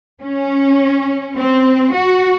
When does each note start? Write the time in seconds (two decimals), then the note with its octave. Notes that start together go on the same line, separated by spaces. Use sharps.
0.22 C#4
1.37 C4
1.94 F#4